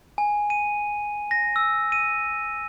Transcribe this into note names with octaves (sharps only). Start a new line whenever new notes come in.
G#5
D#7
A#6
E6
D#7